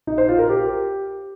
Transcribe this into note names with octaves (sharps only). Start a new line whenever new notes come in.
D#4
C5
F4
A#4
G4